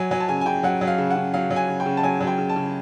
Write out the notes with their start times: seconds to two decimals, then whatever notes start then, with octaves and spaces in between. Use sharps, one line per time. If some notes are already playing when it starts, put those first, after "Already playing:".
Already playing: F#3 G#5
0.11 F#3 G#5
0.20 A5
0.28 C#3 G#5
0.41 G#5
0.46 C#3 G5
0.63 F#3 F#5
0.81 F#3
0.87 F5
0.98 C#3
1.10 F#5
1.15 C#3
1.34 F#3 F5
1.50 F#3
1.56 G#5
1.68 C#3
1.80 G5
1.86 C#3
1.97 A5
2.03 F#3 G#5
2.20 F#3
2.27 G5
2.38 C#3
2.49 A5
2.56 C#3